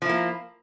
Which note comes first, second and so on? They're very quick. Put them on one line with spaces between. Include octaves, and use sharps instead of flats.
F3 E4 A#3